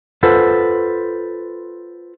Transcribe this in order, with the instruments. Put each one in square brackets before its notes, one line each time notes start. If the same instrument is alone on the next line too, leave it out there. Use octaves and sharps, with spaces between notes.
[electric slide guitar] F4 A4 B4 C5 F#5